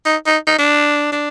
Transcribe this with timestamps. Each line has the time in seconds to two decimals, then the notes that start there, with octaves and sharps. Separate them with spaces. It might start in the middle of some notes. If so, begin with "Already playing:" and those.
0.06 D#4
0.27 D#4
0.47 D#4
0.58 D4
1.12 D4